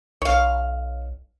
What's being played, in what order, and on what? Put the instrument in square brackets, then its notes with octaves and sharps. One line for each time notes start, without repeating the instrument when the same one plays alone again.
[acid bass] B1 [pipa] C#5 F5